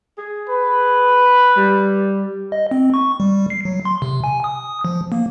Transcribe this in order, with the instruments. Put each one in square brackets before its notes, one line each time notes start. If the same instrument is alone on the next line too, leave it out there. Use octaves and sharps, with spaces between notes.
[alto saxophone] G#4
[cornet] B4
[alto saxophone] G3
[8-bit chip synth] D#5
C4
C#6
G3
C7
F#3
C6
C3
G#5
D#6
F3
A#3